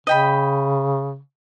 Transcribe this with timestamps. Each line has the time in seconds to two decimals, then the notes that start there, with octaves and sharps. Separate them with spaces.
0.07 C#3 D#5 G5 B5